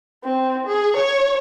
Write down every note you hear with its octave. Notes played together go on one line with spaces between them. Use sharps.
C4
G#4
C#5